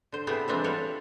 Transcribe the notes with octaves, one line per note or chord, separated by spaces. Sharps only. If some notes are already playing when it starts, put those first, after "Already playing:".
D3 C5
C3 A3 B3 E4 G4 G#4
E3 F3 G3 G#3 C4 D4
F4 G4 A4 B4 C#5 F5